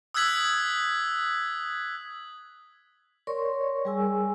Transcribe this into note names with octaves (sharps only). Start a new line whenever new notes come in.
D#6 E6 F#6 G#6 B6 F#7
A#4 C#5 D5 C6 C#6
G3 G#4 G#5 E6